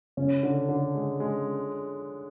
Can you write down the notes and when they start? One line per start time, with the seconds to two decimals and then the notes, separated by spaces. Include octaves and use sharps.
0.17 C#3 C#4
0.43 D3
0.69 D3
0.95 G#3
1.20 G#3